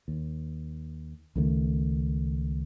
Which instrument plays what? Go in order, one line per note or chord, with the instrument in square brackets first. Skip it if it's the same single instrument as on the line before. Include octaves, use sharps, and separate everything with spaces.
[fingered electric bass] D#2
C#2 D#3 G#3 A3